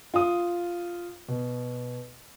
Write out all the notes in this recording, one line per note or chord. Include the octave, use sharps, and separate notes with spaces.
F4 D#6
B2